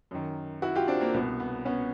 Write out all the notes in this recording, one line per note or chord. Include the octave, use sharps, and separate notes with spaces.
F#2 D#3
E4 F#4
F4 G4
C4 D4
A#3 C4
C2 B2 B3
B3
B3 C#4